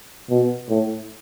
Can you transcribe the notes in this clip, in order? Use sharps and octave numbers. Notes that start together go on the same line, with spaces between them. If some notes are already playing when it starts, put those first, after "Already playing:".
B2
A2